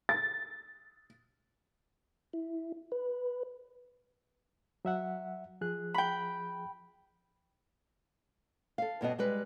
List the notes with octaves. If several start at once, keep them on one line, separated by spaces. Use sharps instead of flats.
A6
E4
B4
F#3 E5 F#5
F3 G#4 F#6
G5 B5
A4 F5
G2 B2 B3 D#5
G3 G#3 B4